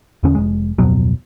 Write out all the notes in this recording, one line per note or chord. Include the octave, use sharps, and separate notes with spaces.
E2 D3 C#4
F1 G#3
D1 F2 B2 F#3